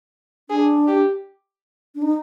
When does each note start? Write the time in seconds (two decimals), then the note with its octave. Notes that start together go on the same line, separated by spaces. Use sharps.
0.50 D4 G#4
0.88 G4
1.95 D4
2.02 D#4